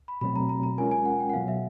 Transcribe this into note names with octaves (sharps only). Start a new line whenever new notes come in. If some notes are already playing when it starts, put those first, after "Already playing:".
B5
B2 F#3 A3 C4 B5
A#5
A#5
A#5
G#3 C#4 F4 A#4 G#5
G#5
F#5
G5
F#5
B2 F#3 B3 F5
E5